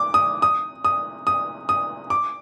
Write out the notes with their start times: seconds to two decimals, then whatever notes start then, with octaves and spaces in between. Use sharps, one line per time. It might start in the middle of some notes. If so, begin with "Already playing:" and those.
Already playing: D6
0.14 D#6
0.42 D#6
0.85 D#6
1.27 D#6
1.69 D#6
2.10 D6